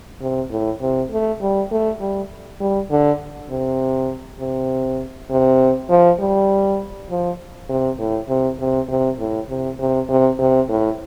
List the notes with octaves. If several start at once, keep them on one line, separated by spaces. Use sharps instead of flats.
C3
A2
C3
A3
G3
A3
G3
G3
D3
C3
C3
C3
F3
G3
F3
C3
A2
C3
C3
C3
A2
C3
C3
C3
C3
A2